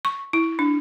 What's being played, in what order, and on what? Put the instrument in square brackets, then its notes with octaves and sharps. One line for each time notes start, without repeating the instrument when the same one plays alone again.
[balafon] C#6
E4
D4